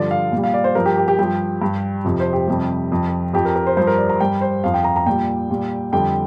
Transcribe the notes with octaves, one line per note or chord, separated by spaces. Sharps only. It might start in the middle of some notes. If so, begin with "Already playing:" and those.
Already playing: G2 D3 F3 D5
F5
A#2
G3
F5
D5
C5
G2 F3 A#4
G4
G4
G4
G2 F3 G4
G2 G3
F2 C3 F3
C5
G4
F2 C3 G3
F2 F3
F2 F3 G4
A#4
A#4
C5
G2 F3 C5
A#4
D5
A#5
G2 G3 G5
C5
F2 F3 F5
G5
A#5
A#5
A#2 G3 G5
A#2 G3
F2 D3 G3 G5